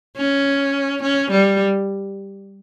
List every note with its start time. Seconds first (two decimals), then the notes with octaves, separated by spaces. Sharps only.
0.17 C#4
1.03 C#4
1.31 G3